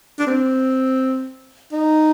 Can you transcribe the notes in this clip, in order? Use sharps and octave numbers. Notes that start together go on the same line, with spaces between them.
D4
C4
D#4